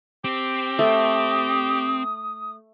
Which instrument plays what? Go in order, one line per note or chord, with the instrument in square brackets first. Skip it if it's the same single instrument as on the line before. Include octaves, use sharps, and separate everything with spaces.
[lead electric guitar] C4 [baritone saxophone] G4
[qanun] A3 [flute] D#6